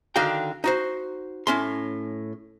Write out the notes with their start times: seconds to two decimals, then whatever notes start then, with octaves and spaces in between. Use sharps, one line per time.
0.16 D3 D#3 D4 F#4 F5 G5
0.64 D#4 F#4 C5
1.47 A2 C#4 C6